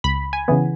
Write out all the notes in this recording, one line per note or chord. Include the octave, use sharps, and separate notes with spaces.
C#2 B5
G#5
C#3 E3 B3